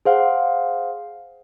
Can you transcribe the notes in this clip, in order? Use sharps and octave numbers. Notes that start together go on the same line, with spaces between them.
G#4 C5 F5 F#5